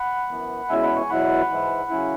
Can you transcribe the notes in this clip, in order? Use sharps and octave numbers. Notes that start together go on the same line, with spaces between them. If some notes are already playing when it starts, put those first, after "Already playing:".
Already playing: F#5 B5
F#2 E3 B3
E2 B2 G#3 C#4 E4 E5 G#5
F#5 B5
G#5 C#6
E2 B2 F#3 E4 F#5 B5
G#2 E3 G#3 E4
C#3 F#3 C#4 E4